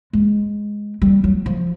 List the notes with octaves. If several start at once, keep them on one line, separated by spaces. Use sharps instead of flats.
G#3
G3
F#3
F3